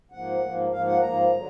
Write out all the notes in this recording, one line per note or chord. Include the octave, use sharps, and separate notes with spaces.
G#2 F3 A#3 F#5
G#2 F3 A#3
G#2 F3 A#3 F5
F#5
G#2 F3 A#3 A#5
D3 F#3